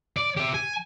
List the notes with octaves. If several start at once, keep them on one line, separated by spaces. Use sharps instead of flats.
D5
G4 E5
G#5